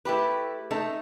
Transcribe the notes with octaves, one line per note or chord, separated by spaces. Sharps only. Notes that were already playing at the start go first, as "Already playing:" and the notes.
A3 E4 G4 B4
A3 D#4 A4